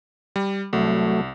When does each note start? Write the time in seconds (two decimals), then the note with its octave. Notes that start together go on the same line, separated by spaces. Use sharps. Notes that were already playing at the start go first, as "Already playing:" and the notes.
0.36 G3
0.73 C2 F#3 A3